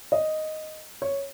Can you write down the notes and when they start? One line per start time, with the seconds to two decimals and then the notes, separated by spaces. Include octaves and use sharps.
0.12 D#5
1.02 C#5